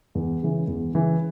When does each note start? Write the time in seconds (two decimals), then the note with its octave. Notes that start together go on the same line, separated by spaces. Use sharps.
0.15 E2
0.42 C#3 E3
0.68 E2
0.94 C#3 E3